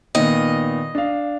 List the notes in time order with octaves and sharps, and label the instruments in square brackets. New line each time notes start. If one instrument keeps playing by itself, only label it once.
[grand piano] A#2 D#3 B3 [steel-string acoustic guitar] D#5
[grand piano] D4 F5